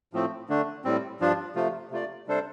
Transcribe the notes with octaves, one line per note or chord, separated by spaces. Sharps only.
A2 F3 A3 C4
D3 A3 D4
A2 G3 C4
G2 F3 D4 F4
C3 F3 A3 F4
C3 A3 F4 D5
C3 G3 D4 A4 C5